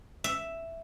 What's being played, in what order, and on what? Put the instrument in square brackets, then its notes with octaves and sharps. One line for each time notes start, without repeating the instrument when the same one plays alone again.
[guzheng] E5